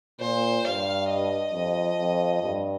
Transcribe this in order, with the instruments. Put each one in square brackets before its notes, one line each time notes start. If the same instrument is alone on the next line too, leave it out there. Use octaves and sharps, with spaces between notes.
[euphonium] A#2 [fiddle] C5
[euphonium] G2 [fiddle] F5
[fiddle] D#5
[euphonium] F2
F2
G2